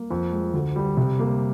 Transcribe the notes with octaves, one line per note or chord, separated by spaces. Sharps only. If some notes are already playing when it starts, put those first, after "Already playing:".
Already playing: A#3
F2
G#3
D2
G3
C3
A#3